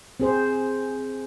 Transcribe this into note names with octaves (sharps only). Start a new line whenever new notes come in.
C4 G#4 C5